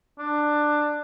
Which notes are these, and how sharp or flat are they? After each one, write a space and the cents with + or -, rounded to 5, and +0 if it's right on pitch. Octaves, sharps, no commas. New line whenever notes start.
D4 +15